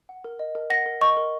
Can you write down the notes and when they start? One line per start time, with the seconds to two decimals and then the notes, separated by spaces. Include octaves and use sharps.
0.09 F#5
0.24 A#4
0.39 D#5
0.55 A#4
0.70 F#5 A#6
0.86 A#4
1.01 D#5 C#6
1.17 A#4